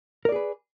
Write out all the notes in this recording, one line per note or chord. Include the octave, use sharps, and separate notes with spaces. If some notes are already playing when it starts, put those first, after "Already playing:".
G#4 A#4 B4 D5